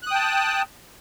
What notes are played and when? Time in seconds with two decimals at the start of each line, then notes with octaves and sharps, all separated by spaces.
0.03 F#6
0.07 D#6
0.11 G5
0.15 A5